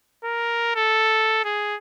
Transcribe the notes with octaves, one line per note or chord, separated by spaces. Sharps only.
A#4
A4
G#4